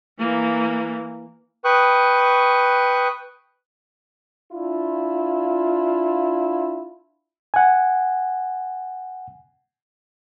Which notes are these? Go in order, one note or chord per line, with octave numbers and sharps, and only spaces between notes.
E3 A#3
B4 G5 C#6 D#6 F#6
D4 E4 F4
F#5 G#5